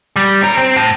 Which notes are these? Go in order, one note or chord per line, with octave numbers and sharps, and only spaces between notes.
G3
C#4 A#4
C4
A2